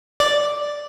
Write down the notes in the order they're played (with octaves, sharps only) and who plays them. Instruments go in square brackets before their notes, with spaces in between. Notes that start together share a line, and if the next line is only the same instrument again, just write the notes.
[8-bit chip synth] D5